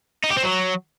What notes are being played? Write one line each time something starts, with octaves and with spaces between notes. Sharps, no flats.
D#4
G4
C4
F#3